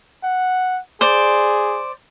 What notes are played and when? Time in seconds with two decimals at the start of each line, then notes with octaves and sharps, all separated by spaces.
0.24 F#5
1.01 G#4 C5 D5